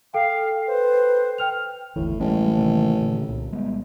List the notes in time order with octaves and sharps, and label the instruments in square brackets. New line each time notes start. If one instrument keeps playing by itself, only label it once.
[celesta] A4 G5 [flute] F5
[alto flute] B4 [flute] C5
[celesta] G5 F6 F7
[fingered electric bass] G1 D2 E3 [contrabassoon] A2
[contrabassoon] A1 [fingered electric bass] G3 G#3
[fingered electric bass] C3 D#3 A#3
A#2 D3
C2 A#2
G3 G#3 B3